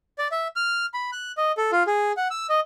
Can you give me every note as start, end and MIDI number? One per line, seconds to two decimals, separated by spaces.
0.18 0.28 74
0.32 0.48 76
0.56 0.86 89
0.94 1.11 83
1.12 1.32 90
1.37 1.52 75
1.57 1.71 69
1.72 1.83 65
1.87 2.12 68
2.17 2.28 78
2.31 2.47 88
2.49 2.60 75